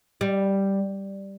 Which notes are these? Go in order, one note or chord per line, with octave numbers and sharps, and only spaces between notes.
G3